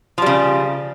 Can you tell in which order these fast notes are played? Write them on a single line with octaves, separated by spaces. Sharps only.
F3 G3 C#3